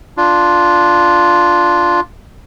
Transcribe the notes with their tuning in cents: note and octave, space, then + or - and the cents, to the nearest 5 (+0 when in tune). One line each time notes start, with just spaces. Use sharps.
D4 +0 F4 +0